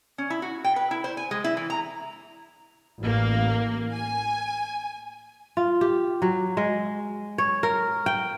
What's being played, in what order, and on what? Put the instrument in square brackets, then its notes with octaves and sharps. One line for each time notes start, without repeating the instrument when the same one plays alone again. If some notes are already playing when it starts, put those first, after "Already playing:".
[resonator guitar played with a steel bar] C#4
E4
F#4
G5
B4
E4
C5
G#5
G#3
E4
E3
A#5
[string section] A1 A#3
G#5
[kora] F4
G4
F#3
G#3
C#5
A#4
G5